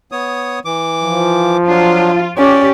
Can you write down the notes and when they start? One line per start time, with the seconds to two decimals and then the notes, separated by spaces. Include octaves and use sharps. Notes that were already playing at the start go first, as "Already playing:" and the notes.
0.12 B3 C#5 D#6
0.65 E3 D6
1.03 F3
1.68 F#3 D4 F4
2.38 C#4 G4 D5